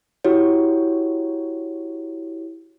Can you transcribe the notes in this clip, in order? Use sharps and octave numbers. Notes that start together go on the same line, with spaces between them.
E4 F#4 G4 C#5